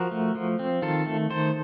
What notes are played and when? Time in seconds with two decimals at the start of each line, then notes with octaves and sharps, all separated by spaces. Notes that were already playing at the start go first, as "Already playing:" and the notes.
Already playing: F3 F#4 A#4
0.11 A3
0.35 F3
0.59 C4
0.82 D#3 F4 A4
1.06 A3
1.30 D#3 A4 C5